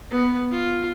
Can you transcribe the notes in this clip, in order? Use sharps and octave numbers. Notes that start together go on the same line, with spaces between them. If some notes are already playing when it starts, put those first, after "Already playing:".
B3
F4